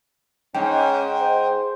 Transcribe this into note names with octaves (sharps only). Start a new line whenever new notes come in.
G#2 C#4 G5
C5